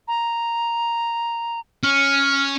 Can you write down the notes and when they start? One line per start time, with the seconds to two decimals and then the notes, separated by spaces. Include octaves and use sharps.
0.08 A#5
1.83 C#4 F6